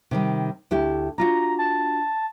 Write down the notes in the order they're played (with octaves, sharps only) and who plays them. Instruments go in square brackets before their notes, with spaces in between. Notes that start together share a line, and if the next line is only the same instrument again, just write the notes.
[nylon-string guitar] C3 D#3 G3
D2 E4 G4
[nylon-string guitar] D4 F4 F#4 [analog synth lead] A#5
[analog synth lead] A5